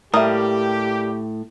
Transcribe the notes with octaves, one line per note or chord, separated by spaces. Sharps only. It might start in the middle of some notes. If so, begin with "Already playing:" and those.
A2 G3 A#3 G4 A#4 E5 D#6